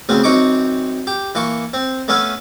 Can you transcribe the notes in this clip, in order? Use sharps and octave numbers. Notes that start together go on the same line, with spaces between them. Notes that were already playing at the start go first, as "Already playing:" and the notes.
D2 C#3 B3 C4
F#2 C4 D#4 C#6 D6
G4
E3 A#3 C#6
C4
A3 B3 C#4 E5 F5 G#5